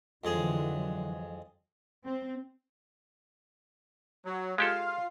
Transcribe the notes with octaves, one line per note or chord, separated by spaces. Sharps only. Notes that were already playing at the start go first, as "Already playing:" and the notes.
F2 D3 E3 F#3 G#3 G#4
C4
F#3
G#3 F4 G4 A4 F5